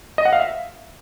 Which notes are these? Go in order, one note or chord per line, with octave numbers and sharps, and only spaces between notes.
D#5
F#5
F5
E5